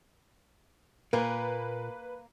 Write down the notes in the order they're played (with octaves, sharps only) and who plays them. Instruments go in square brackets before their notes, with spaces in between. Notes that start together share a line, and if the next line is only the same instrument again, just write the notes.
[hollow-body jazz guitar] A#2 [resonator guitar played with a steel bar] A#3 [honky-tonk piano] B4